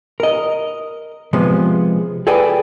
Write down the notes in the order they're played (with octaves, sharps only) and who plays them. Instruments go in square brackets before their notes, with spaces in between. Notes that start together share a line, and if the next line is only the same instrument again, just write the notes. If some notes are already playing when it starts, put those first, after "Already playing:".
[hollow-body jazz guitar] A#4 D#5
C3 F3 G#3 B3
G#4 A4 B4 D5 G5 G#5